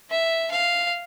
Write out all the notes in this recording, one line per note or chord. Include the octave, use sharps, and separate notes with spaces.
E5
F5